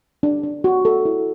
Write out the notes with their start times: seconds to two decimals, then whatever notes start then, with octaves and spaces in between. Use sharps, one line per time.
0.23 D4
0.43 D4
0.64 F#4
0.85 A4
1.05 E4